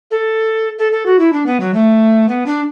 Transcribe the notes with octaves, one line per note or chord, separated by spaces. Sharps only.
A4
A4
A4
F#4
E4
D4
B3
F#3
A3
B3
D4